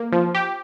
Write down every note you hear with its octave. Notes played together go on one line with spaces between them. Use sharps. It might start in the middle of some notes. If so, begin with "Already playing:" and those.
Already playing: A#3
F3
G4